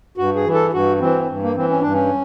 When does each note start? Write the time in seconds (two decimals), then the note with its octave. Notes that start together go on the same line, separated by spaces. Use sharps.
0.17 G2 F#4
0.35 G#4
0.45 E3
0.54 A4
0.73 G2 F#4
1.00 E3 C4
1.29 G2
1.43 A#3
1.56 E3 C4
1.69 C#4
1.81 G2 D4
1.93 C#4